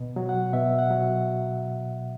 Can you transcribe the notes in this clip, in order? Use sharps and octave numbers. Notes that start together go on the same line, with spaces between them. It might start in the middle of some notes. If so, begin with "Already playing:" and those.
Already playing: B2
F#3
F#5
B2 E5
F#5
F#3